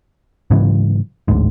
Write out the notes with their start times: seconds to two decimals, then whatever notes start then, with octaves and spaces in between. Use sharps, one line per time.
0.51 G#2 C#3 E3 F#3
1.28 D1 A1 D2 G#2